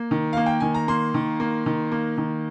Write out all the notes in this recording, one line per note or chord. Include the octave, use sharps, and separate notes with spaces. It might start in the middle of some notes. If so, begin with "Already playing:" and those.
Already playing: A#3
D#3
A#3 F5
G5
D#3 G#5
A#5
A#3 C6
D#3
A#3
D#3
A#3
D#3